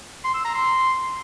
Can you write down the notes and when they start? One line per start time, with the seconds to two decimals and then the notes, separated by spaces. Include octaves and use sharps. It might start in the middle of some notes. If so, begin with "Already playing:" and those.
0.24 C6
0.34 E6
0.45 A#5
0.55 C6